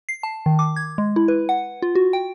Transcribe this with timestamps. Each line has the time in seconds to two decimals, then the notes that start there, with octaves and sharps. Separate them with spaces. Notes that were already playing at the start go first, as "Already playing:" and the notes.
0.09 C7
0.23 A5
0.46 D#3
0.59 D6
0.76 G#6
0.98 G#3
1.16 E4
1.28 B4
1.49 F#5
1.82 F4
1.95 F#4
2.13 G5